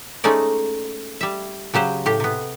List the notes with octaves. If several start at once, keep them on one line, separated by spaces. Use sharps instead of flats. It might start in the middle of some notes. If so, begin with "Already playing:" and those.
G#3 A3 C#4 D#4 D5
G3 E5
C#3 F#3 G4 C5
A2 G4
C3 B3